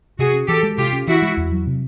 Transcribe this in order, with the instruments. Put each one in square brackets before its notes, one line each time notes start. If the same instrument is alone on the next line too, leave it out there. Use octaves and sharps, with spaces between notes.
[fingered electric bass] C3 [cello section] F#4 G#4
[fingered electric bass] C#4
[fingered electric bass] E3 [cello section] G4 A4
[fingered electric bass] G#3
[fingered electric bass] C3 [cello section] F4 G4
[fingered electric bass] C#4
[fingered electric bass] E3 [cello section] E4 F#4
[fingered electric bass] G#3
E2
F#3
C3